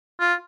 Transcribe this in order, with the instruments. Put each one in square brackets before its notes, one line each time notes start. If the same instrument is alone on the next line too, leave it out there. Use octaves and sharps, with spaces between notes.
[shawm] F4